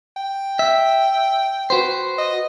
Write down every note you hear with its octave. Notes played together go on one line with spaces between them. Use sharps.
G5
E5
F#4 B4 C5
D#5